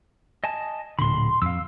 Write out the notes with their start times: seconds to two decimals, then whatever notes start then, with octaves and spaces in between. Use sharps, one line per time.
0.44 D#5 G#5 A5
0.99 D1 A#2 D3 B5 C6
1.42 F2 F5 E6